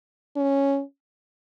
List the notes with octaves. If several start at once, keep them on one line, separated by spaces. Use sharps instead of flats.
C#4